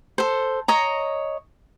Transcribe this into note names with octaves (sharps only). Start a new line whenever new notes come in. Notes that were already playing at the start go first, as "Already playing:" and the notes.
A4 C5
C#5 D#5 A#5